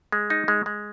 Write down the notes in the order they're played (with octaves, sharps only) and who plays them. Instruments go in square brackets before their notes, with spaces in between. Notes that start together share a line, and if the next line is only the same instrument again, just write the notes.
[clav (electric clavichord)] G#3
D#4
G#3
G#3